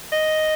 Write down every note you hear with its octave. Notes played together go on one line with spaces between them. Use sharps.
D#5